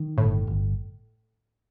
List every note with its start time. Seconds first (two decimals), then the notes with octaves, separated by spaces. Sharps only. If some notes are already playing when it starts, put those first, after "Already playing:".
Already playing: D#3
0.18 G1 A2
0.47 G1